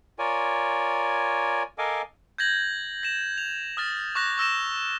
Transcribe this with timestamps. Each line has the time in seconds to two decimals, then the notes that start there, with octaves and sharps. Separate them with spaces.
0.19 F4 A#4 C#5 D5 G#5
1.78 A4 A#4 D#5 F5 G#5 D6
2.38 G6 G#6 A#6 F#7
3.03 A#6 E7
3.38 F7
3.77 D#6 F6 A6
4.15 C#6 D6 F#6 A#6
4.38 C#6 E6 A#6 E7